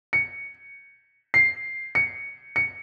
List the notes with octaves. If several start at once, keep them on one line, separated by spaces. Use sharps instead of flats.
C#7
C7
C#7
C#7